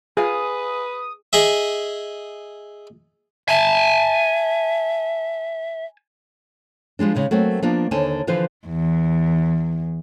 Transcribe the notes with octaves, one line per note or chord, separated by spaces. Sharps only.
F4 G#4 B4 F5 G#5 D#6
G#4 D#5 E5
E5 G#5 A5
F3 G3 G#3 D4
C#3 G#3 D#4
F#3 A3 A#3 C4
F3 A#3 B3 D4 F4
D#2 D3 C5 C#5 G#5 A5
D3 E3 F3 B4 C5
E2